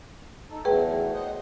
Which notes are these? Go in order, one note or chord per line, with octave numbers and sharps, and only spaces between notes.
D#4 A4
E2 F#3 A3 G#4 B4 G5
C5 D#5 F#5